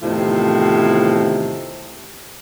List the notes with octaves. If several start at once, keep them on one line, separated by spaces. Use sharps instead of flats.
E2 A2 C3 D#3 F3